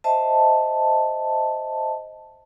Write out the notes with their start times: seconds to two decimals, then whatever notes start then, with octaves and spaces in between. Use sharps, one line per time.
0.04 C5 D#5 E5 A5